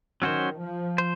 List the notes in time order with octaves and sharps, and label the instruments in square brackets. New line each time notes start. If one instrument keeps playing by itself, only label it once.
[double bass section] D#3 [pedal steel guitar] F#3 C#4 F#4 C5
[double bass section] F3
[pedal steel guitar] C5